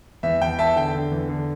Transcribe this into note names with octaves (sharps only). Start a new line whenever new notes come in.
E2 E5
E2 G5
E2 E5 A5
D3 G5
D3
E2
D3